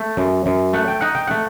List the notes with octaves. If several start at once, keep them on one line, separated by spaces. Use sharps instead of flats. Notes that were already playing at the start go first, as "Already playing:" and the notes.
Already playing: A3
F#2
F#2
A3 F#5
G5
D#4 F#5
G5
A3 F#5